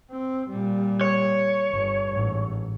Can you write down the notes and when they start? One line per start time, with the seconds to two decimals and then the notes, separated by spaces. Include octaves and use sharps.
0.11 C4
0.50 A#2 G3
1.01 C#5
1.71 G1
2.12 A1 G#2